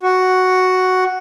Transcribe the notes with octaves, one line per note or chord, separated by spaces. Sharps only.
F#4